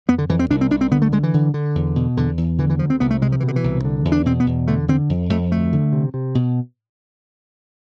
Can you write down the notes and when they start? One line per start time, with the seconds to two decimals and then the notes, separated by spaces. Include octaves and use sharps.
0.08 F2 B3
0.18 D3
0.29 F2 E3
0.39 C4
0.50 C2 D4
0.61 C4
0.70 C2 D4
0.81 C4
0.91 D3 B3
1.02 A3
1.12 D3 G#3
1.23 E3
1.34 D3
1.54 D3
1.75 E2
1.96 B2
2.17 E2 D3
2.38 E2
2.58 D3 E3
2.70 E3
2.79 D2 F3
2.90 C4
3.00 C2 B3
3.10 A3
3.21 C3 G#3
3.32 F3
3.40 E3
3.43 B2
3.48 D3
3.56 E3
3.64 C2
3.85 D3
4.05 E2
4.12 D4
4.25 B2 C4
4.40 B3
4.46 E2
4.67 D3 A3
4.88 D3 C4
5.09 F2
5.30 F2 A3
5.51 D2 A3
5.73 D3
5.92 C3
6.14 C3
6.35 B2